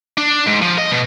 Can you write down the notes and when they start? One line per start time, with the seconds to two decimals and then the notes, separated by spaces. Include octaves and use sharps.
0.17 D4
0.46 G#2
0.62 F3
0.78 D#5
0.91 B2